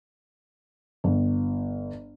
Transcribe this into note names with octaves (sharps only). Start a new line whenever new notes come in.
G1